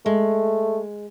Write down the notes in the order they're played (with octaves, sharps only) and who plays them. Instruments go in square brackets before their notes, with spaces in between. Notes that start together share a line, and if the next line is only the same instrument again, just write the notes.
[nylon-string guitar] G#3 [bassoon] A3